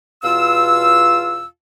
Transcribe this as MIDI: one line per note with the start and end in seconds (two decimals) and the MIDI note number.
0.23 1.46 40
0.23 1.46 47
0.23 1.46 65
0.23 1.46 77
0.23 1.46 88